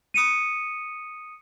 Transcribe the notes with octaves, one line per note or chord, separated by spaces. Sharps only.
D#6 C#7 D#7